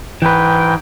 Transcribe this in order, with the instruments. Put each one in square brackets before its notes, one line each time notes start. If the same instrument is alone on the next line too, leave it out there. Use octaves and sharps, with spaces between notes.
[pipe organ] G#2 G5 [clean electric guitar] E3 B4